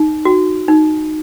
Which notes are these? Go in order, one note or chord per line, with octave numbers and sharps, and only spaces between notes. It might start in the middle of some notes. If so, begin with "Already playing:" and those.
Already playing: D#4
F#4
D#4